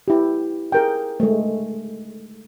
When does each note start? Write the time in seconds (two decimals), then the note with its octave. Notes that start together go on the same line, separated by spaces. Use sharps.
0.08 E4 G4
0.72 G#4 A#4 G5
1.20 G#3 A3